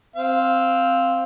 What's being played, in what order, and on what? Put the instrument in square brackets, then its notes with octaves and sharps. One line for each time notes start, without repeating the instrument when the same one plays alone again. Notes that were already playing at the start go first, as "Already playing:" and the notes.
[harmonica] C4 F5